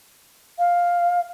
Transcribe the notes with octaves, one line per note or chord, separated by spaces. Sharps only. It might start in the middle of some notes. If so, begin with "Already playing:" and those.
F5